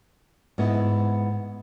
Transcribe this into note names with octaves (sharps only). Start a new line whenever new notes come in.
G#2 B3 E4